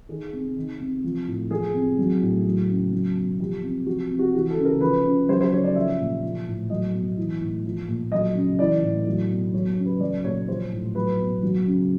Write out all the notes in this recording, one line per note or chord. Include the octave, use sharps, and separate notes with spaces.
D#3 G#4
C3
D#3
C3
F3
A2
F3 G#4
C3
F#3
A2
F#3
C#3
F#3
B2
F3 G4
C3
F3 F#4
C3
F#4
E3 F#4
A4
C#3
A#4
F3 B4
C#3
F#3 C5
C5
C#3 C#5
D5
F3 E5
A#2
F3
A2
F#3 D#5
B2
E3
A2
F3
A#2
F#3 D#5
C#3
E3 D5
A2
F#3
B2
F#3 C#5
C#5
C#3
B4
F#3 D5
A#2 C#5
F3 C5
A2
F#3 B4
B2
F#3
C#3